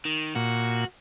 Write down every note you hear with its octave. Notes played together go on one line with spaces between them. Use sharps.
D#3
A#2 F#4